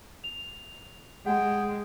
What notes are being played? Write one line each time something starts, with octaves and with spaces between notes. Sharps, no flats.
F7
G#3 G#4 F#5 G5